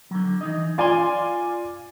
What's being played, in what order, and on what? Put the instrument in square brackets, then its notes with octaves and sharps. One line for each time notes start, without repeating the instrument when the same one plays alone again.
[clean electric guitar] D3 F#3
E3 D#4 D#5
[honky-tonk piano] F4 D5 G#5 [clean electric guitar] F5 C6